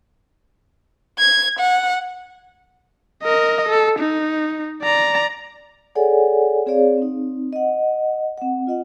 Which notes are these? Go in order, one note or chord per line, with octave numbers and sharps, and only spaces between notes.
G#6
F#5
A#4 D#5
A4
D#4
D5 A#5
G#4 A4 C#5 D5 F#5 G#5
C4 G#4 C#5 D5 F5
C4 D#4
D#5 F#5
C4 F#5
F4 D#5 F#5